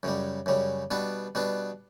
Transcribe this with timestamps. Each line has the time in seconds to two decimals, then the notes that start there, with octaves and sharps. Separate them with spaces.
0.03 F#2 C#3 G3
0.46 F#2 C#3 G3
0.91 B2 G3 B3 D4
1.35 B2 G3 B3 D4